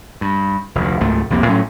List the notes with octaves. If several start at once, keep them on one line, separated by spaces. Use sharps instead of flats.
G2
F1 D2
F#1 C#2 G#2 A3
C2 F2 C3 A#3
A2 F#3 C#4